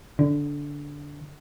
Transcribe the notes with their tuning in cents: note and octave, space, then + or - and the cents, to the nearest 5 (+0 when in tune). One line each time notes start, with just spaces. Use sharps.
D3 -15